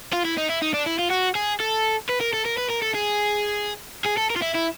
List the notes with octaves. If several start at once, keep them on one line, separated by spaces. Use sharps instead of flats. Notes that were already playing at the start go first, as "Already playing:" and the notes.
F4
E4
D#4
E4
D#4
D4
E4
F4
F#4
G#4
A4
B4
A#4
A4
A#4
B4
A#4
A4
G#4
G#4
A4
A#4
F4
E4
E4